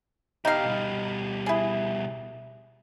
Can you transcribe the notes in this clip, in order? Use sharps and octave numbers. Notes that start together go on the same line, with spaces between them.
B3 D#4 G4 F5
B2 G3
E4 G#4